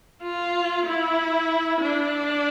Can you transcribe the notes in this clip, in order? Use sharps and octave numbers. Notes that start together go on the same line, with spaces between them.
F4
E4
D4